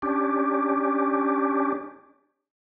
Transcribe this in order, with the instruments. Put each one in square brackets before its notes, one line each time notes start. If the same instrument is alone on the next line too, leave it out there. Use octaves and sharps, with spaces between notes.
[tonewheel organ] C#4 D4 G4